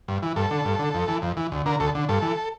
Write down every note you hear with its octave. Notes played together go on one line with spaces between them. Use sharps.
G2
E3
G2 A4
D3
G2
D3
F2
E3
F2
E3
D2
D3 A#4
D2 A4
D3
G2 A4
E3